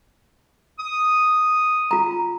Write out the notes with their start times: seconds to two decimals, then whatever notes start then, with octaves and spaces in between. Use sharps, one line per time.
0.79 D#6
1.91 F4 A#5